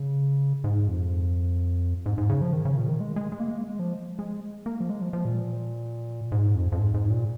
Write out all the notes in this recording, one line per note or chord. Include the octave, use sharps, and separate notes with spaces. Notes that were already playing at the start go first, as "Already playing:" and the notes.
Already playing: C#3
G#2
F2
G#2
G#2
C#3
F3
D#3
C#3
A#2
D#3
G#3
G#3
G#3
A#3
G#3
A#3
G#3
F3
G#3
A#3
F3
G#3
F3
F3
A#2
G#2
F2
F2
G#2
G#2
A#2